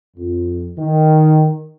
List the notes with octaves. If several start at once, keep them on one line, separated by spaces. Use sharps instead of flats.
F2
D#3